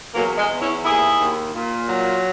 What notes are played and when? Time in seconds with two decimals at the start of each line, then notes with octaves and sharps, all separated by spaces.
0.14 E2 F#3 A#3
0.37 G#3
0.49 E2
0.61 C#4 E4
0.84 D#2 E4 G#4
1.19 D#2
1.55 A#2
1.89 F#3